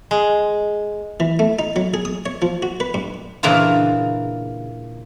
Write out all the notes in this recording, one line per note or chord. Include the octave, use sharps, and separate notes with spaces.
G#3
E3
A3
D#4
F#3
G#4
D#6
C#5
F3
F#4
B4
G2
A#2 C#3 E3 A#3 D4 F4